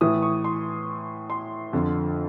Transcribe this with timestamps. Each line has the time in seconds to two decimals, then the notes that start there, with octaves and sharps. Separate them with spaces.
0.01 A2 E3 D#6
0.22 C#6
0.44 C6
1.30 C6
1.73 F2 D3 F3